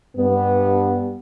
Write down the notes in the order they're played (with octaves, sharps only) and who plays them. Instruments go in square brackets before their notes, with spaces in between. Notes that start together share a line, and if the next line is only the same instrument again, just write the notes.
[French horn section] G2 B3